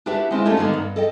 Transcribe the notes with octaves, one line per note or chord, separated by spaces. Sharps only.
D4 E4 F#4 G4 B4 E5
G#3 C4 E4 F4
A3 C#4 D#4 F4 G4 A4
D3 D#3 A#3 B3 D#4
G2
A4 D#5 G5